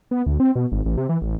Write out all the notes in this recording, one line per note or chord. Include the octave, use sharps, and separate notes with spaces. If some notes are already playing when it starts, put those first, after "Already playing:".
B3
D2
C4
B2
G#1
A1
C3
E3
A1